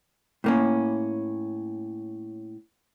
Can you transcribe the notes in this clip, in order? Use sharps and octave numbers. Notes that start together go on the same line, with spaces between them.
A2 A#3 C#4